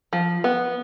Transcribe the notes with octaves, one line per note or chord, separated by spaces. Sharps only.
F3
B3